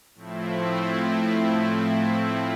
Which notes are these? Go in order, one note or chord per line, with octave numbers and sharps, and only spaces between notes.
A2 F3 A3 C4 E4